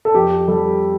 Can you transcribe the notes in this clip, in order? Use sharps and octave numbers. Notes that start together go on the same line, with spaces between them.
A4
F2 G4
G3 A4